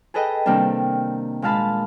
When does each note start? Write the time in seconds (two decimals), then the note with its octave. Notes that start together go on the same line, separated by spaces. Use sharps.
0.14 G#4 A4 B4 D#5 G5
0.46 C3 D#3 G3 A#3 D4
1.42 A#2 G#3 F5 A5 B5